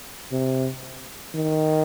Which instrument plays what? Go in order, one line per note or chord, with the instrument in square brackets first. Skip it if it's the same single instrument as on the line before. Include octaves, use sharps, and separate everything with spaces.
[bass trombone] C3
D#3